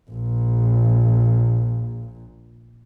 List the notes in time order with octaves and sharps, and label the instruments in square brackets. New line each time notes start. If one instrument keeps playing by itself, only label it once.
[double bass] A#1 A#2